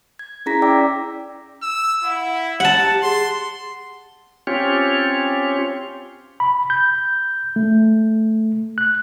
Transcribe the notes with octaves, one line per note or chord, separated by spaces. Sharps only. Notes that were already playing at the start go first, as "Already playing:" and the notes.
G#6
C#4 E4 G#4 A#5 A#6 B6
D5 G5 D6 E6
E6
E4 F#5
G4 F#5 A5
G#4 C6
C4 C#4 F4 G4 C#5
B5
G6
A3
F#6